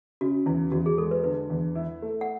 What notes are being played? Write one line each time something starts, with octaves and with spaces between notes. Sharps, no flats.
C#3 F#4
E2 E4
E2 F#4
G#4
G#3 A4
B4
D3 B4
E2
E4
A3
F#5